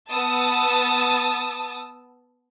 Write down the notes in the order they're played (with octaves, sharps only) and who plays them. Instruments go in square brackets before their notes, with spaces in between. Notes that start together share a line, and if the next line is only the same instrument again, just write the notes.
[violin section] B3 A5 D#6 E6 A6